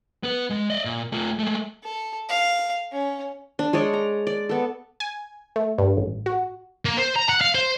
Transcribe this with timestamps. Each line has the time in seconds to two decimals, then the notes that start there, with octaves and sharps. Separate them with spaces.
0.23 B3 B4
0.50 G#3
0.70 D5 D#5
0.85 A#2
1.13 A3 F4
1.39 G#3 A3
1.83 A4
2.29 F5
2.92 C#4
3.59 D4
3.73 G#3 G#4 C#5 D5
3.93 A#5
4.27 D5
4.49 B3 A4
5.00 G#5
5.56 A3
5.78 G2
5.97 A1
6.26 F#4
6.85 A#3
6.97 C5
7.16 A#5
7.29 F#5
7.41 F5
7.55 C5